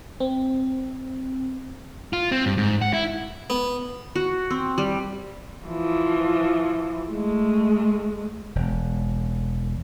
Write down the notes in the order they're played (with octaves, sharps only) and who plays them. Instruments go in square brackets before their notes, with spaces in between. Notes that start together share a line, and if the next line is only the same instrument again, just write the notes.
[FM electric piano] C4
[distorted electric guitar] F4
C4
G2
G#2
F#5
E4
[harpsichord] B3
[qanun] F#4
C4
G3
[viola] E3 F3
G#3 A3
[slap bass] E1